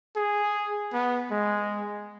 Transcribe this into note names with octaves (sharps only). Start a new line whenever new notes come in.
G#4
B3
G#3